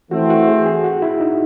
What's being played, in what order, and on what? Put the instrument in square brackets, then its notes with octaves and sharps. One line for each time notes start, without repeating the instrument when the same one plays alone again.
[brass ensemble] E3 A3 C4 [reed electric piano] F#4
[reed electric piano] F#4
G#4
G#4
F#4
E4
D#4